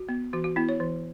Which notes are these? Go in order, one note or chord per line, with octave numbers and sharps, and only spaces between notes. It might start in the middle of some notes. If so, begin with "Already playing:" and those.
Already playing: F#4
B3
E3 F#4
F#4
B3 E4
C#5
E3